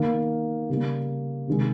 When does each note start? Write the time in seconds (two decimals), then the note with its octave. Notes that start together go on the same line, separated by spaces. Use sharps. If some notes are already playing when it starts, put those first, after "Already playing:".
Already playing: D#3 A#3
0.69 C#3 G3 A#3
1.47 C3 D#3 G#3